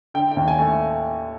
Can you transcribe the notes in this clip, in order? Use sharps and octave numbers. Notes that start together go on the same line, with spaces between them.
D3 G5
G5
D#2
G#5
A3